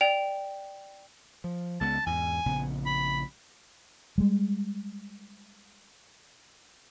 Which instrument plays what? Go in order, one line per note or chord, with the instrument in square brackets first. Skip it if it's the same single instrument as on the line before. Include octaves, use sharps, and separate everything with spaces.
[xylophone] D5 G5 F7
[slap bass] F3
[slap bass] C#2 G#3 B3 [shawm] A5
[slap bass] E2 G#2 [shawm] G#5
[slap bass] A#1 C#3 B3
[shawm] B5
[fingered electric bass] G3 G#3